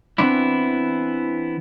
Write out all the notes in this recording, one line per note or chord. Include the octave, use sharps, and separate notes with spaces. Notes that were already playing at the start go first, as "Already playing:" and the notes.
E3 B3 C4 D4 E4